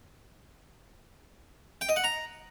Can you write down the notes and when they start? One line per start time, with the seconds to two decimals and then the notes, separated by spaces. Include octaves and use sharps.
1.81 G5
1.89 D#5
1.96 F#5
2.04 A#5